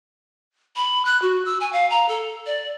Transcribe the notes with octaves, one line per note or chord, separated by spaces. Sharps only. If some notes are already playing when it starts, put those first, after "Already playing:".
B5
F#6
F#4
E6
G#5
F5
A#5
A4
D5